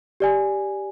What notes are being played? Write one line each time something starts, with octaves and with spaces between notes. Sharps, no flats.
G4 D5 G#5